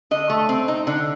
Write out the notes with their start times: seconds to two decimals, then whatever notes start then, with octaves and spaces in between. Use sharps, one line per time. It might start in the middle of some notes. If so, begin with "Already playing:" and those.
0.11 D3 D#5
0.30 A3
0.49 C4
0.68 D#4
0.87 D3